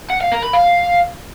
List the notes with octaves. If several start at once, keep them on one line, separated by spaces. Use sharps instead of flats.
F#5
F5
A#4
B5
F5